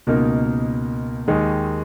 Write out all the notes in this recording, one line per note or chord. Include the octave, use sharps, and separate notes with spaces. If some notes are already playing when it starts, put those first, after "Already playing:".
C#2 B2 A#3 D#4 A#4
D#2 D#3 G#3 D#4